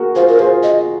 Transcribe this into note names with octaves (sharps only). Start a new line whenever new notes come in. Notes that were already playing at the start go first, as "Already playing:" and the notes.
Already playing: F#4 G#4 A#4
F4 G#4 C5
A#4
F4 G#4 C5
D#5